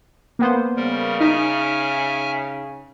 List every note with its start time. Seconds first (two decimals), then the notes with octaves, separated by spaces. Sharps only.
0.39 A#3 B3 C5
0.76 C#3 G3 A#4
1.20 D#4 E5 G#5 F6